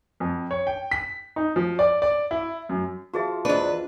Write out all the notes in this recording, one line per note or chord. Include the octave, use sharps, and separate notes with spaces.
F2
C#5
G5
B6
D#4
F3
D5
D5
E4
F#2
F3 F#4 G#4 E5
E2 D4 G#4 B4 C5 D#5